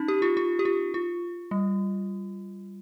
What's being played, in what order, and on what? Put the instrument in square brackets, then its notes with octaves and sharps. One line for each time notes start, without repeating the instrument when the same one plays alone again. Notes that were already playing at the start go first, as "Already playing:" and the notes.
Already playing: [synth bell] C#4 D#4
G4
F4
F4
G4
F4
F4
G3